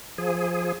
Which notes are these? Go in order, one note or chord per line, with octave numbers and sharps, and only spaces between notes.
F3 G#4